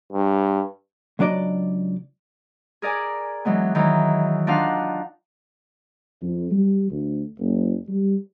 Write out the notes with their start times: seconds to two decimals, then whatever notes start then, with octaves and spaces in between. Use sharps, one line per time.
0.12 G2
1.19 C#2 F#3 D4 D5 D#5
2.82 G#4 A#4 D5 G#5
3.45 E3 F#3 G#3 B3
3.75 D#3 E3 F#3
4.47 D4 D#4 F4 F5 F#5
6.23 F2
6.52 G3
6.91 D2
7.39 F#1
7.88 G3